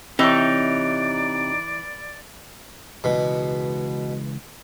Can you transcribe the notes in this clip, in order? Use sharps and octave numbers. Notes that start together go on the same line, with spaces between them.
C3 E3 D#4 C#5 D5
C#2 B2 E3 G#3